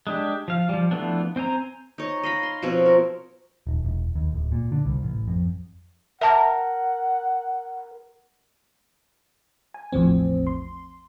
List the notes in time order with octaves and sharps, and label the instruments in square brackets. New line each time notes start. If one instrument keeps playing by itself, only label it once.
[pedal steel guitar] G#3 D4 G4
F3 F5
F3 G3
E3 F3 A3 B3 D4
C4 C5 G#5 A#5
[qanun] D#4 C#5
D#5 F5 B5
C6
B2 F3 C4 C#5
A#4
[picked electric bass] D#1
E1
D#2
D1
A#2
D3
C2
A1
F2
[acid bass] A#4 [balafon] E5 A5 [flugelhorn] F#5
[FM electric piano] G#5
A1 E2 A2 F3 C4
C6